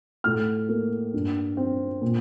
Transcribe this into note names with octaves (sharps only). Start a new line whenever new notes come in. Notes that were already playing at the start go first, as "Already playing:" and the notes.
A2 F6
A#3
G2
C4
A#2